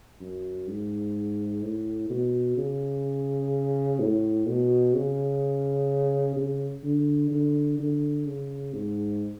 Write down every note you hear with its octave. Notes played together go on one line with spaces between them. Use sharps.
F#2
G#2
A2
B2
C#3
A2
B2
C#3
C#3
D3
D3
D3
C#3
G#2